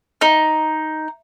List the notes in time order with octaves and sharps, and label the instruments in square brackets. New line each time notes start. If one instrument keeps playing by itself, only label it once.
[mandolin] D#4